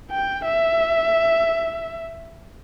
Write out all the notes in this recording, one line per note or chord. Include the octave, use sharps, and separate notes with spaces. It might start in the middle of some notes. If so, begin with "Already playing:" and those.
G5
E5